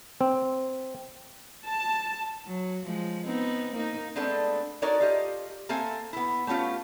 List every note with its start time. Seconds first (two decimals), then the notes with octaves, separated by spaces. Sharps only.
0.21 C4
1.65 A5
2.46 F#3
2.85 F3 G#3
3.26 B3 C4 D#4
3.74 A#3 D#4
4.16 G#3 A3 B3 C4 D4 A4
4.82 D#4 F#4 A4 A#4 C#5 D5
5.00 F4 G4 D#5
5.69 A#3 C4 A4 E5 G#5
6.13 B3 E4
6.47 A3 B3 C#4 F4 G4